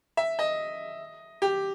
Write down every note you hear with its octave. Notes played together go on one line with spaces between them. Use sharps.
E5
D#5
G4